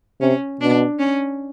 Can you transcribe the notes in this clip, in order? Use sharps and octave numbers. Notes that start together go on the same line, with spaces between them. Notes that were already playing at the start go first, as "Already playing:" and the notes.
C3 C#4
B2 D4
C#4